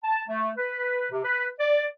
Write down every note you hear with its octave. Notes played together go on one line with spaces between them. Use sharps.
A5
A3
B4
C3
B4
D5